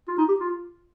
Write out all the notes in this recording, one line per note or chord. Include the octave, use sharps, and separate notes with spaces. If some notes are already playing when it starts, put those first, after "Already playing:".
F4
D#4
G4
F4